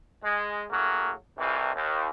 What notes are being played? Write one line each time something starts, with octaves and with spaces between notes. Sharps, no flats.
G#3
A2 C#3 F#3 A#3
C2 F2 C3 E3
D#2